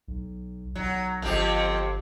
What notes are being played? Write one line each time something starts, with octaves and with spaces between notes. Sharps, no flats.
B1
B1 F#3
G1 F2 C4 G4